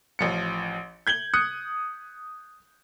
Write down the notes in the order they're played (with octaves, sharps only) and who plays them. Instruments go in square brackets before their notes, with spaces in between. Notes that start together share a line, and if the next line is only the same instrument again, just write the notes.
[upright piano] A1 F3 C#7
G6 G#6 F#7 G7
D#6 F#6 C#7